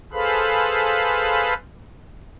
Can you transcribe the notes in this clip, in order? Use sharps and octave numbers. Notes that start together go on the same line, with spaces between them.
G#4 A4 B4 C5 F5 B5